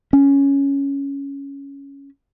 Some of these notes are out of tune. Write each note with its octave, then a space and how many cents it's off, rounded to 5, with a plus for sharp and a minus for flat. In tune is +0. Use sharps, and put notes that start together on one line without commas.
C#4 +5